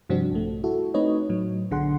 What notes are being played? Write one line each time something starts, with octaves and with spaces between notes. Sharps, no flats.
G2 C3 F3 C4 D4 F#4
A#1 A3
E4 F#4 A4
A3 C4 D#4 B4 C#5 D#5
A2 F#3
B1 B2 D3 G#4 F#5 C6